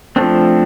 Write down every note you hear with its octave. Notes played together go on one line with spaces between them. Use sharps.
F3 A3 C4 D4